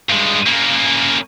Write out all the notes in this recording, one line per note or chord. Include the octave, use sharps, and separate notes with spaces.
G2 G#3
C#3 A#3